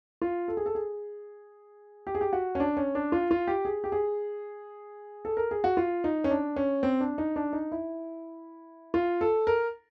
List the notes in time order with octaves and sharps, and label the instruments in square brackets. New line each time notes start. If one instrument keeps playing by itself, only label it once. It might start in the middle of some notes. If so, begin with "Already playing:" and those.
[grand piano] F4
A4
G#4
A4
G#4
G4
G#4
G4
F#4
C#4
D4
C#4
D4
F4
F4
G4
G#4
G4
G#4
A4
A#4
G#4
F#4
F4
D#4
C#4
D4
C#4
C4
D4
D#4
D4
D#4
E4
F4
A4
A#4